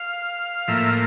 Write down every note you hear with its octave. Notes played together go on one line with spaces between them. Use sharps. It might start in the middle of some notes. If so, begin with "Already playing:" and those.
Already playing: F5
A2 F3 A#3 E5